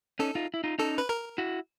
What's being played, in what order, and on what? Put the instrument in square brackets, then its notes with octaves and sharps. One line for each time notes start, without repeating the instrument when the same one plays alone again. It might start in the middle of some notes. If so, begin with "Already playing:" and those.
[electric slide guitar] C#4 D#4 [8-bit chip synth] A4
[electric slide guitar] D#4 F4
E4
D#4 F4
[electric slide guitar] C#4 D#4 [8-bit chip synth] A4
[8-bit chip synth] B4
A#4
[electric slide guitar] E4 F#4